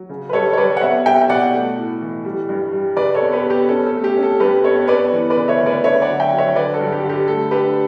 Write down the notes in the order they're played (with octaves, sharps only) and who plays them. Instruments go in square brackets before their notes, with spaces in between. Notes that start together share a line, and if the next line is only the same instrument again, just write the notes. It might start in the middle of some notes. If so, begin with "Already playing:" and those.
Already playing: [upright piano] F#3
C#3
B4
G3 A4 C#5
C#5
G3 B4 D5
F#5
B3 C#5 E5
G3 E5 G5
G5
B2 D5 F#5
A3
A2
E3
G3
G2
G3
C#3 B4 D5
A4 C#5
B3
G4 B4
B3
G4
C#4 A4
A4
A3
G4
C#4
A4
G2 G4 B4
B3 A4 C#5
B3 B4 D5
E3
B4 D5
C#3
C#5 E5
D2
B4 D5
D3 C#5 E5
D5 F#5
F#3
E5 G5
F#3
C#5 E5
D3 B4 D5
A4
G2
G4
D3
G4
A3 A4
D4 G4 B4